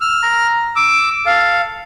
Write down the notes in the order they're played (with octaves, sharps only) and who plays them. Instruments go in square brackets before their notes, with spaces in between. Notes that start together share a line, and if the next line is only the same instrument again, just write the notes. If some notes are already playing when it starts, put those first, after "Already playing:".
[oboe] E6 [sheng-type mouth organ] F6
[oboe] A#5
[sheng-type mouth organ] D6 [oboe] E6
[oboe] A4 [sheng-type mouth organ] F5